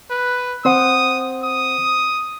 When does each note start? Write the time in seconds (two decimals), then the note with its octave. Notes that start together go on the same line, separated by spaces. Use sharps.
0.11 B4
0.65 C4 C5 F#5 D#6
1.43 D#6